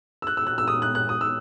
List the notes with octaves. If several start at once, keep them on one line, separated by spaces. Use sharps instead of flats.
E6
F#6
E6
F#6
E6
D#6
F#6
F#6
D#6
E6